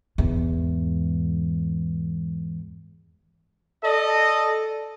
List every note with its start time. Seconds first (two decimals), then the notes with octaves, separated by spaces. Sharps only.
0.18 E2 G#2
3.84 A4 D5 D#5